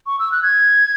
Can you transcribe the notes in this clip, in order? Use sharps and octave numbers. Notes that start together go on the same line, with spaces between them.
C#6
E6
F#6
G#6